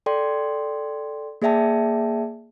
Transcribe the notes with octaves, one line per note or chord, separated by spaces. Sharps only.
A4 D5 G5 C6
A#3 G#4 D5 E5 G5 A5